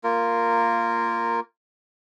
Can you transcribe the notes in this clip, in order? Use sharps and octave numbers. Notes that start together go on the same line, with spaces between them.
A#3 F4 A#4